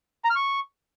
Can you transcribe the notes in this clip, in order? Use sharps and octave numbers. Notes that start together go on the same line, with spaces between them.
A#5
F6
C#6